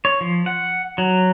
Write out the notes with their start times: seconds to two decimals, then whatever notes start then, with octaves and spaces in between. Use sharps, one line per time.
0.05 C#5
0.21 F3
0.46 F#5
0.98 F#3